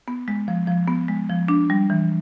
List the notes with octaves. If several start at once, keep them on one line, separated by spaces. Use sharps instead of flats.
B3
G#3
F3
F3
B3
G#3
F3
D4
G3
E3